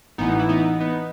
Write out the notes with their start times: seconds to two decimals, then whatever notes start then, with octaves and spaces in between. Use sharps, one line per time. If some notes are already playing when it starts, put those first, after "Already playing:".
0.18 A1 A2 E3 B3 D#4
0.39 E4
0.49 B3 D#4
0.80 B3 D#4